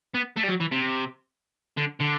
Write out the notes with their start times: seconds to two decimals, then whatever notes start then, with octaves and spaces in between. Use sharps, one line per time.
0.14 B3
0.36 A3
0.43 G3
0.48 F#3
0.60 E3
0.71 C3
1.78 D3
2.01 D3